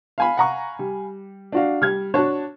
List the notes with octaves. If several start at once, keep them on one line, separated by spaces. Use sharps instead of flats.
F5 G#5 B5
F#5 A#5 C#6
G3
D4 F#4 F5
G3 F6 G#6
D4 F#4 C#5 A5